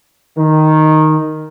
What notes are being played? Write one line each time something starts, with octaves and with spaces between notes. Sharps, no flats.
D#3